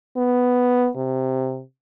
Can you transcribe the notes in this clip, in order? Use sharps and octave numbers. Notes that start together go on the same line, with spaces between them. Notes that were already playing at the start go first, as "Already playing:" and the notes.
B3
C3